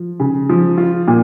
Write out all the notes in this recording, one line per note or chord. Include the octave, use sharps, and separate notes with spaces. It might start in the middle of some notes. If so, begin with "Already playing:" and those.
Already playing: F3
C#3
F3
F4
A#2